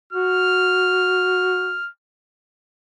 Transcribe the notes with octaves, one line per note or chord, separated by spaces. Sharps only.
F#4 F6